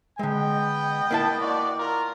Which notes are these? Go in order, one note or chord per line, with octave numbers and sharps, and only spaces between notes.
D3 G#3 B3 D#5 G5
A#3 E4 A5
F#4 D5
F4 A#4